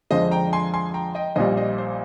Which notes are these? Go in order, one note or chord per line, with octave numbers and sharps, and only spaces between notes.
F2 D3 F3 G#3 C5 D#5
G5 A#5
G#5 C6
G#5 C6
G5 A#5
D#5 G5
A#1 A#2 G3 C5 D#5
C5 D#5
C5